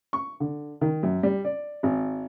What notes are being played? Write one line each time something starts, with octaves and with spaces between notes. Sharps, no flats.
C#6
D3
D#3
F#2
G3
D5
G#1